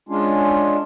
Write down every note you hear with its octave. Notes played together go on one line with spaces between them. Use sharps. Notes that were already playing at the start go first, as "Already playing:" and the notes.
G#3 C#4 D4 F4